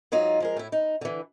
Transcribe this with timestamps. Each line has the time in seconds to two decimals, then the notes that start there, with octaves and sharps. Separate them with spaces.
0.12 G#2 F#3 D#4 F4
0.40 F3 G#3 A#4
0.57 A2 E4
0.72 D#4
1.01 D3 E3